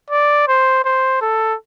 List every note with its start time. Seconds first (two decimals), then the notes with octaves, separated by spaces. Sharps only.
0.11 D5
0.48 C5
0.85 C5
1.22 A4